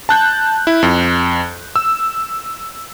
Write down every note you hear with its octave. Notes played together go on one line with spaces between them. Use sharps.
A5 F#6 G6
E4
F2
E6